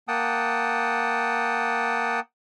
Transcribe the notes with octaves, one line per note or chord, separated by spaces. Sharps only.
A#3 F#5 G5 A5 D#6